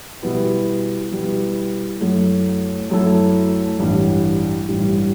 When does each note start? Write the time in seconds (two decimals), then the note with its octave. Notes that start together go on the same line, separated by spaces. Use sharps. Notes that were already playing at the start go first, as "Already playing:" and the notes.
0.23 B2 G3 B3 E4
1.12 B2 G3 B3 E4
2.01 F#2 F#3 A3 E4 A4
2.90 F#2 F#3 A3 E4 A4
3.79 A1 G2 E3 G3
4.68 A1 G2 E3 G3